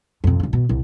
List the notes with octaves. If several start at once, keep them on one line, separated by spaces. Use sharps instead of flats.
F2 C3
C#2 C#3
B2
C2